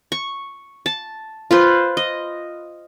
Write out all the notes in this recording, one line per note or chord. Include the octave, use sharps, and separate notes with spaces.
C#6
A5
F4 B4 C5
D#5